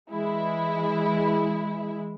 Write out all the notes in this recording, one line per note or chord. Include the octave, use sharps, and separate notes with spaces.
E3 G#3 E4